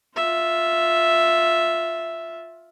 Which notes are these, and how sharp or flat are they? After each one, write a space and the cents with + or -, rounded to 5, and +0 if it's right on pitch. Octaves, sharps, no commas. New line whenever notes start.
F4 +5 E5 +0